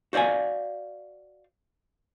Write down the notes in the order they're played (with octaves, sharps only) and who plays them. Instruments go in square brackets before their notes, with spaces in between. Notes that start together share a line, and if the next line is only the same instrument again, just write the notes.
[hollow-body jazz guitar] F#4 C5 D5 F5 G#5